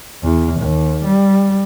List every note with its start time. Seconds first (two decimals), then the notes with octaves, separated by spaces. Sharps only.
0.23 E2
0.60 D#2
1.05 G3